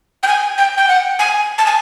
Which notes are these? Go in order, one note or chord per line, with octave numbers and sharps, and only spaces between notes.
G5
G#5
G5
G5
F#5
G#5
A5
G#5